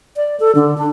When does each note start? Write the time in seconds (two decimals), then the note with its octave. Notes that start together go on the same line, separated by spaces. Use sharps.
0.16 D5
0.40 A4
0.55 D3
0.78 D4